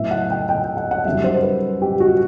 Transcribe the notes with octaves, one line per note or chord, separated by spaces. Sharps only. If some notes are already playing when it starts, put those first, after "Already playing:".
Already playing: A2 F#3 B3 E4 E5
F#5
G5
G5
G5
F#5
F#5
F#2 D#3 G3 E5
C5
B4
G4
F#4